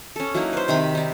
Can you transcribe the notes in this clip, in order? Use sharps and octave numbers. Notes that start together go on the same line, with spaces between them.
C#4 A4
F#3 A#3 D#4 E4
B4 C5
C3 D#3 A#5 B5
D#4 D5